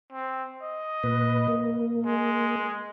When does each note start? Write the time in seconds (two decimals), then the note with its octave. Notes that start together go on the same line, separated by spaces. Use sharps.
0.13 C4
0.63 D#5
1.03 A#2 B4
1.48 A#3
2.06 G#3